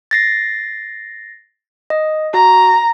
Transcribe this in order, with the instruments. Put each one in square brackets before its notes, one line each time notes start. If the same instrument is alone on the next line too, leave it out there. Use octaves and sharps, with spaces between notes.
[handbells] A6 A#6 C7
D#5
[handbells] F#4 [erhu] A#5